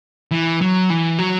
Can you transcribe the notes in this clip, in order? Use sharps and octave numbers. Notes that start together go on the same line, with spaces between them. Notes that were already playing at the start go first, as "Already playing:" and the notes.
E3
F#3
E3
F#3